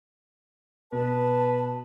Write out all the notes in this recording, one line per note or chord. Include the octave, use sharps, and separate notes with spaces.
B2 B4 A5